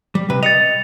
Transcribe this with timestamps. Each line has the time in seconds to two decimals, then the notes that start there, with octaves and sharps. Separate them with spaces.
0.15 G3
0.30 C3 B4
0.43 D#5 A6 C#7 F7